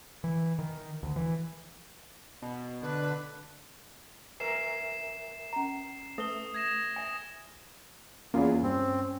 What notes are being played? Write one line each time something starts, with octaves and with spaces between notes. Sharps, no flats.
E3
D#3
D2
E3
B2
D3 D4 B4
A#4 B4 E5 G#5 C7 E7
C#4 A#5
A3 B4 E5 D#6 G7
G#6 A#6 E7
E5 G#5
E2 A#3 C#4 F4 G#4
G2 C4